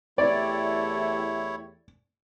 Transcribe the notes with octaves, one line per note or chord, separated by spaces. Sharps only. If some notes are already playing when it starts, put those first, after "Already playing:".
E2 A3 E4 G4 C#5 D5